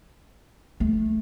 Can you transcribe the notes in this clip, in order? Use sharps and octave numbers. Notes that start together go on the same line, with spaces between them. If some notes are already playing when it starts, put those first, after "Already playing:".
A3